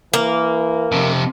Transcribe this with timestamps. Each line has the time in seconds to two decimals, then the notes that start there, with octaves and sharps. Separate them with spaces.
0.14 E3 A#3
0.92 F2 C3